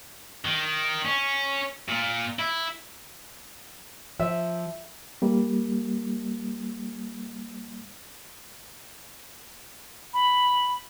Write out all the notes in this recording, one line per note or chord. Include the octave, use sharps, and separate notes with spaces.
D#3
C#4
A#2
E4
F3 E5
G3 A#3
B5